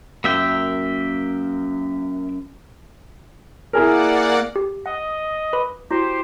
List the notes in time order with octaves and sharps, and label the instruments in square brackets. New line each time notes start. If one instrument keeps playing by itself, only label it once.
[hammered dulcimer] F#2 [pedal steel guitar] A#3 E5 G5
[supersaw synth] A#3 D5 F#5 [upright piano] E4 G#4 A#4
[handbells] G4
[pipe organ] D#5 [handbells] F#5
[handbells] B4 B5 D6
[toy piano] E4 F#4 [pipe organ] G4 C5